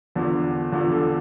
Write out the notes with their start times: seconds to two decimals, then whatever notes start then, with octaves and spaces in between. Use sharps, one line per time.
0.15 E2 D3 F3
0.72 E2 D3 F3
0.91 A4